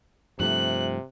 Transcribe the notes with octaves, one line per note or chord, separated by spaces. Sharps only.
G2 C3 F3 A3 F#6